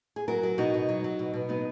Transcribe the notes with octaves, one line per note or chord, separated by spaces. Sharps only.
G#4
F#3 F#4 A#4
F#3
B2 D#4 F#4
B2
F#3
F#3
B2
B2
F#3 B3 D#4